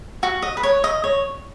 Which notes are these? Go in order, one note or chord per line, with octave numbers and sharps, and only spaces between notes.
F#4
D#5
B4
C#5
D#5
C#5